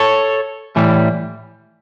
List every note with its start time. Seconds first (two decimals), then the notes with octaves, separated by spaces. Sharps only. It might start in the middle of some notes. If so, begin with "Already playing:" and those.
Already playing: A4 C#5
0.76 A2 E3 G3